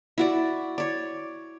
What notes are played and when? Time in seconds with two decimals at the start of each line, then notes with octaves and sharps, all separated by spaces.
0.18 E4 F#4 D5
0.78 C#5 D5